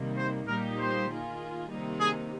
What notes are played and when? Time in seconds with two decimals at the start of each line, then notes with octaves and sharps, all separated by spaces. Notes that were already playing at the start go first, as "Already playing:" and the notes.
Already playing: C3 D#3 G3 A#3
0.18 C5
0.48 A#2 G3 A#3 D#4 G4 A#4
0.79 C5
1.09 D#3 A#3 F4 G#4
1.70 C3 D#3 G3 A#3 D#4
2.00 G#4